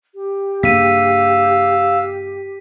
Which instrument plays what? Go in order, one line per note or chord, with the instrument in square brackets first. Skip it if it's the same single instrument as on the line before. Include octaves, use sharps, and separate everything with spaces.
[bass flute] G4
[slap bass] G2 C#3 A#3 [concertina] F5 E6 [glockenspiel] B6 D#7